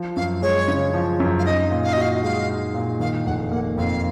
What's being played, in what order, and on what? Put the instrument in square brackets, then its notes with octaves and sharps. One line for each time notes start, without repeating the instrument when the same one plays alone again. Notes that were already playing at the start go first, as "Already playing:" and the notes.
Already playing: [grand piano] F3
[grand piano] F#2 [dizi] F5
[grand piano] G#3 [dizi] C#5
[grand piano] C#3
F3
F#2
[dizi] F5
[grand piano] D#4 [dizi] D#5
[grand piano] A#2
[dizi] F5
D#5
[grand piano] F#4 [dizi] F5
[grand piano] G#3 [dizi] F5
[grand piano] D#4
A#2
[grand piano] D#3 [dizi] F5
[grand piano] F1 [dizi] F#5
[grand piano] A#3 [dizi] F#5
[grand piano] F2 [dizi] F5